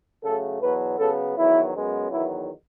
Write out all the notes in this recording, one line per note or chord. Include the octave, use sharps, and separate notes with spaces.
C#3 F#3 A3 A4
E2 B2 F#3 B3 B4
C#3 F#3 B3 A4
E2 D#3 F#3 B3 E4
F#2 C#3 G#3 B3
E2 D#3 F#3 B3 E4